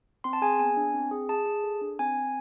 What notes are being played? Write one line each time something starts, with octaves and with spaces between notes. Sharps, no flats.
C4 C6
A5
G#4 G#5
B3 G#5
D4
C4
G#4
G#4 A5
G#4
A4
D4
C4 G#5
C4